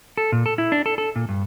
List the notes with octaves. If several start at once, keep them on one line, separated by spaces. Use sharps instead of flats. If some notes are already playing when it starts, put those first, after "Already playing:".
A4
A#2
A4
E4
D4
A4
A4
A#2
G2